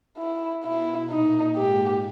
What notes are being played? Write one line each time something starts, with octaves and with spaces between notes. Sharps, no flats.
E4
B2 B3 E4
A#2 A#3 D#4
G#2 G#3 G4